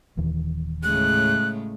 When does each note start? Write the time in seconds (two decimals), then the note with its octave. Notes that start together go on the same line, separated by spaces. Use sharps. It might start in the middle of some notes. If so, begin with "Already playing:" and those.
0.17 D#1 D#2 E3
0.83 A2 C#3 G#3 F#6